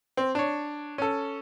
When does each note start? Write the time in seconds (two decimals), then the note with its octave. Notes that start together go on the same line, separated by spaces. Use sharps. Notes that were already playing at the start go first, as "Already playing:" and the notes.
0.17 C4
0.35 D4 C#5
0.98 C#4 A4